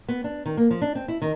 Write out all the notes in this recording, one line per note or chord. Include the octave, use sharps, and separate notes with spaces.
B3
D4
D#3
A#3
F3
D4
C4
E4
D#3